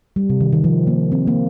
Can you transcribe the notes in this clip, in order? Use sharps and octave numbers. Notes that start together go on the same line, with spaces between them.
G3
C3
D#3
D#3
F3
A#3
C4
A#3